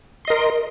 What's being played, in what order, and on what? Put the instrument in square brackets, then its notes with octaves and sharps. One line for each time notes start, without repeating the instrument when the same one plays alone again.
[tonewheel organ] C6
D#5
A#4